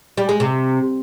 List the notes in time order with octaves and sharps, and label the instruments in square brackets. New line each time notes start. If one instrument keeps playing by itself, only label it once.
[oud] G3
G#3
C3